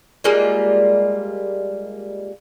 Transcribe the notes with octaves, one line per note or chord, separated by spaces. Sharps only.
G3 G#3 A#3 F4